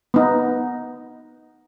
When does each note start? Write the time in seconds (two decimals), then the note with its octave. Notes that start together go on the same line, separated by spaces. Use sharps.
0.14 B3 D#4